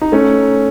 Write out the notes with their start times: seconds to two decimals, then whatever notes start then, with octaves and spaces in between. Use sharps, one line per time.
0.01 D#4
0.12 A3 C#4